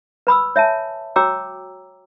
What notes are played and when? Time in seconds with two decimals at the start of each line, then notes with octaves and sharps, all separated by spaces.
0.27 B4 B5 D#6 E6
0.56 C#5 E5 G#5 A5
1.16 F#4 C#5 G5 A#5 D6 E6